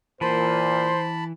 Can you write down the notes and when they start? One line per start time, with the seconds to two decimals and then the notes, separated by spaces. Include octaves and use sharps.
0.21 A#2 E3 C5 A5 B5